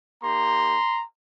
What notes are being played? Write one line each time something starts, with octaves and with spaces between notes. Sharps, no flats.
A#3 D#4 G4 A#5 C6